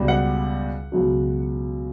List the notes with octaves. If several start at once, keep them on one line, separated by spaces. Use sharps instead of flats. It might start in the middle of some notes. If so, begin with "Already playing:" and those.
Already playing: C#2 B2 G3
F#5
C#2 B2 F#3